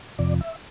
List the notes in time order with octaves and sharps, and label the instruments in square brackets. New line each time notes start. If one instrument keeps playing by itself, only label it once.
[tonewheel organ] F2 C3 F3 D5
E5